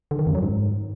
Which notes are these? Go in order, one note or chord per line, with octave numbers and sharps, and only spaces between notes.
D3
D#3
F#2
F#3
G#2